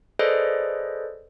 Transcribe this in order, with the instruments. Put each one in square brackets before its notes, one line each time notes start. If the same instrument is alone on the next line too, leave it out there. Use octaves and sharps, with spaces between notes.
[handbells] G#4 A4 B4 C5 D5 D#5